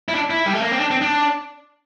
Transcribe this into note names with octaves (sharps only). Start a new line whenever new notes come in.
E4
D4
E4
G3
A3
A#3
C4
D4
C4
D4